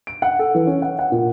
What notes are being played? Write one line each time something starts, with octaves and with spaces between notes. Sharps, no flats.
D7
F#5
A4
E3
C#4
F#5
F#5
A#2